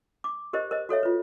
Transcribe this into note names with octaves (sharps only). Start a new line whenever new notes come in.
D6
G4 A#4 C5 D#5
A#4 C5 D#5
F#4 A4 C#5 E5
F4 B4